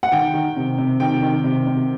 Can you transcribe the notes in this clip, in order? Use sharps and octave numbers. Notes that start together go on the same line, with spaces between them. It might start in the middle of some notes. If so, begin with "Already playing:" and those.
F#5
D#3 G5
D#3
C3
C3
D#3 G5
D#3
C3
C3